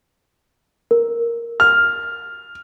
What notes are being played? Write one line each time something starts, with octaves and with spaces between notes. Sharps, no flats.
A#4
F6